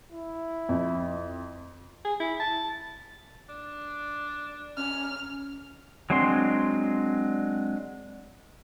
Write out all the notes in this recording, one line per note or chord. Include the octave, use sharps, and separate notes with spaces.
E4
F2
G#4
E4
A5
D4
C#4 F6
F#3 G#3 C4 D4 C6